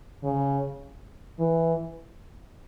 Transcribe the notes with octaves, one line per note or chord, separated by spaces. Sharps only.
C#3
E3